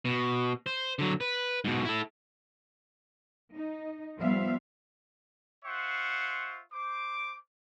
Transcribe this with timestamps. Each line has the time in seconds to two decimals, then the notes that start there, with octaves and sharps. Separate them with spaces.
0.05 B2
0.66 C5
0.99 D3 F#3
1.21 B4
1.65 G#2 B2
1.85 E4 A4
3.54 D#4
4.19 F3 G3 B3 E5 F5
5.65 F4 C5 E5 F#5 C#6
6.72 C5 D6